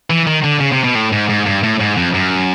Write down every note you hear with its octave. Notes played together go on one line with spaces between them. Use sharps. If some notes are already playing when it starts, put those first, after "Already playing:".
E3
D#3
D3
C#3
C3
B2
A2
G#2
G#2
G2
A2
G#2
F2
F#2